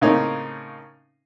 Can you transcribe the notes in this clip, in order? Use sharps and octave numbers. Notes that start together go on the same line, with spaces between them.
A2 C#3 A#3 C4 C#4 D#4